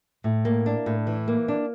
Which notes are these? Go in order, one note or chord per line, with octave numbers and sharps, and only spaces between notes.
A2
A#3
D4
A2
E3
A#3
D4